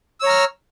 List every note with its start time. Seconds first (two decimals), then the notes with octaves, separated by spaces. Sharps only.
0.20 E6
0.23 C#5
0.26 A#5
0.29 F6